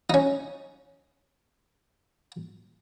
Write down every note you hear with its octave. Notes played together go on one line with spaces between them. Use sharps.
C#4 D#4